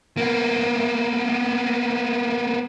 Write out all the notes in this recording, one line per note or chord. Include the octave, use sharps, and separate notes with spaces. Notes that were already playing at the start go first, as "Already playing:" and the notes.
A#3 B3